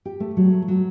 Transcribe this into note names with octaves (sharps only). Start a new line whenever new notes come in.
G4
A3
F#3
A3
F#3